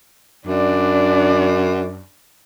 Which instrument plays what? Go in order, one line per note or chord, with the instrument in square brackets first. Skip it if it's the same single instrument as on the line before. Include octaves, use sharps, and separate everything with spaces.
[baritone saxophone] F#2 [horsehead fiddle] D4 D5